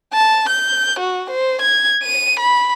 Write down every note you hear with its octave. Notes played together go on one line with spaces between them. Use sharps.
A5
G6
F#4
C5
G#6
D#7
B5